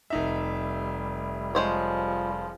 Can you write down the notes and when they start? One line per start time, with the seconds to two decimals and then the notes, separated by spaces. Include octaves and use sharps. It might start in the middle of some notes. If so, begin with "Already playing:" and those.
0.10 F1 G3 D#4 E5
1.55 F3 G3 G#3 C5 C#5